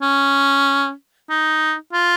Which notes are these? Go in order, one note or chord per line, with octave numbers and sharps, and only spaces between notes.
C#4
D#4
F4